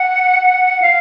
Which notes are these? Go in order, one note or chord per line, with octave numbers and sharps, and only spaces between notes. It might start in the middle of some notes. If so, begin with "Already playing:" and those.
Already playing: F#5
F5